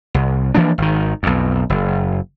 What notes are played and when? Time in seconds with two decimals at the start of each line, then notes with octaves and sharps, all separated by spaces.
0.14 C2
0.55 E3 F3 A#3 D4
0.78 G#1 D#3
1.23 B1 F2
1.70 F#1